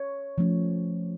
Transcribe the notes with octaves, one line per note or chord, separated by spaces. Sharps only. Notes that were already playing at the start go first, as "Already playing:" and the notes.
Already playing: C#5
F3 A3 C#4